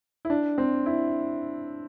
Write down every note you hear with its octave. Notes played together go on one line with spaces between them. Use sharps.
E4
D4
C4
E4